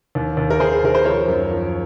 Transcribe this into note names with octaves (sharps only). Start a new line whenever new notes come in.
D#2
D#2
A#4
D#2 G#4 C5
D#2 A#4
C5
F3 A#4 C#5
F#2
F3